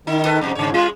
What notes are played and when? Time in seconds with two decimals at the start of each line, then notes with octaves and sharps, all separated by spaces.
0.07 D#3 D#4
0.25 D#4 A4 B4
0.41 F2 G#2 C3
0.55 G#2 C#3 C#5
0.74 G3 G#3 F4